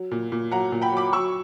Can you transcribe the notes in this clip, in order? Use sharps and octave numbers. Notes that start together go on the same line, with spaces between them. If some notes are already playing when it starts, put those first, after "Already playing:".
Already playing: F#3
A#2
A#2
F#3 F#5 A#5
A#2
G5 B5
F#3
B5 D6
F#3 C#6 E6